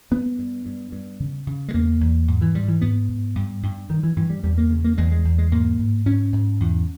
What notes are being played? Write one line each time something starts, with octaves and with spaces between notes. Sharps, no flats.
G2 B3
G2
G2
G2
C#3
C#3
G#3
E2 A#3
E2
G#2
E3
G#2 G3
E3
G#2 B3
G#2
G2
G2
G2 D#3
E3
G2 E3
G3
E2 G3
A#3
C#3
A#3
E2 G#3
G#3
E2
G#3
G#2 A#3
G#2
G#2 C#4
G#2
E2